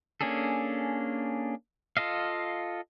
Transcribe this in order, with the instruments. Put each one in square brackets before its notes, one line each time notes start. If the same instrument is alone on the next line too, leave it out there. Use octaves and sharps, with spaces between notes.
[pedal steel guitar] A#3 C#4 D4 G#4 A4
F4 A4 D#5 F5